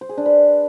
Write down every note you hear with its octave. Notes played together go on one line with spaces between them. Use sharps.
C5
G#4
D4
B4